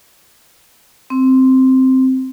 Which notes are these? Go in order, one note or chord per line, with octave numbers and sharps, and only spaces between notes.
C4